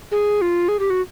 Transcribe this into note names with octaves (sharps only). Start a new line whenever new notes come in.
G#4
F4
G#4
G4
F#4